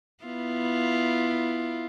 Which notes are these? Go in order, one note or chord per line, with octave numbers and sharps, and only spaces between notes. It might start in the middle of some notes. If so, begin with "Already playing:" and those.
B3 E4 F4